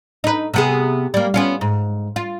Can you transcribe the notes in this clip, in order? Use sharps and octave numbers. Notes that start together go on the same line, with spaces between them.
D#4 B4
C3 B3 G#4
G3 A#3
B3 C#4 F4
G#2
F4